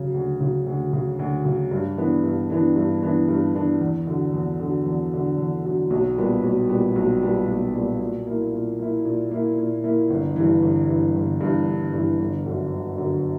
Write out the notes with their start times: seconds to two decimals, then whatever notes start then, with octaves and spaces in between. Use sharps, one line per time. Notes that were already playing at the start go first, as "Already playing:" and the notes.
Already playing: C#3 F#3
0.14 D2
0.40 C#3 F#3
0.66 D2
0.93 C#3 F#3
1.19 D2
1.45 C#3 F#3
1.71 G2
1.97 E3 B3 D4
2.24 G2
2.50 E3 B3 D4
2.76 G2
3.03 E3 B3 D4
3.29 G2
3.55 E3 B3 D4
3.81 E2
4.07 D3 F#3
4.34 E2
4.60 D3 F#3
4.86 E2
5.12 D3 F#3
5.38 E2
5.65 D3 F#3
5.90 B1
6.17 A#2 G3 B3
6.43 B1
6.69 A#2 G3 B3
6.96 B1
7.22 A#2 G3 B3
7.48 B1
7.74 A#2 G3 B3
8.00 A#2
8.27 A#3 E4
8.53 A#2
8.79 A#3 E4
9.05 A#2
9.31 A#3 E4
9.58 A#2
9.84 A#3 E4
10.10 G1
10.36 G2 E3
10.62 G1
10.89 G2 E3
11.15 G1
11.41 G2 E3
11.67 G1
11.94 G2 E3
12.20 G1
12.46 F#2 D3
12.72 G1
12.98 F#2 D3